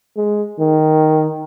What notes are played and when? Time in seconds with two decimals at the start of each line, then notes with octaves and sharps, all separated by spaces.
0.17 G#3
0.59 D#3